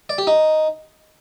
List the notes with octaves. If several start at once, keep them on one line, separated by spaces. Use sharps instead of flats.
D5
G4
D#4